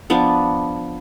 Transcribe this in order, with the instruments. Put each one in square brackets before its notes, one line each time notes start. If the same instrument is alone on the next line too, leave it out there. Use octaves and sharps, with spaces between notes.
[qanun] F3 B3 D4